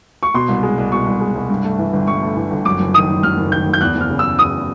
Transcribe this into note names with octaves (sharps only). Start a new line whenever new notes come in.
C#6
B2 C6
C2
G#3
C2
B2 C#6
C2
G#3
C2
G2
A3
E3
G1
G2 C#6
A3
E3
G1
F#2 D6
F#1
D#3 D#6
F#1
F#2 F6
F#1
D#3 G6
F#1
G6
E2 F#6
F#1
F6
C#3
E6
F#1
E2 D#6